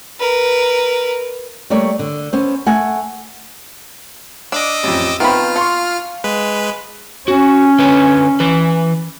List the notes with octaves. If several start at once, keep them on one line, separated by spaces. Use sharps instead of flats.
A#4 B4
G3 A3 A#3 C#5 D5
D3
B3 C#4 C5
A3 F#5 G#5
D4 D#5 D6 E6
A1 F2
D#3 F3 B3 C4 F4 B5 F6
A4 F5 C6 C#6
G#3 B4
C#4 F#4
D3 B4 C#5
E3 B4